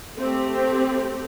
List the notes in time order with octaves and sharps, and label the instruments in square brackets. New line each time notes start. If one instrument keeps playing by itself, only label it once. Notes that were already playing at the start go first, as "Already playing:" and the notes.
[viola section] A3 C4 G4